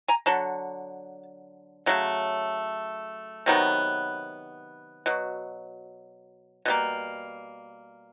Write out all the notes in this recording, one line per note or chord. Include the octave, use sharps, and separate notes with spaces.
G#5 A#5
D3 F#3 A5
C#3 F#3 A3
C3 D#3 F#3 B3
B2 F#3
B2 G3 A#3